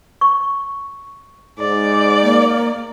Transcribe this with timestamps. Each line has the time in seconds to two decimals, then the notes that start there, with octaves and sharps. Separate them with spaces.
0.21 C#6
1.59 G#2 D5
2.23 A#3